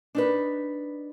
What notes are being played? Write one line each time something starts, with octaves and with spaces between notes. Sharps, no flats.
D4 D#4 B4